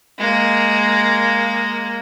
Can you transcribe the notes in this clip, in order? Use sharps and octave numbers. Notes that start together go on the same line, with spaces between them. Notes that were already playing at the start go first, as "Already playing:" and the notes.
G#3 A#3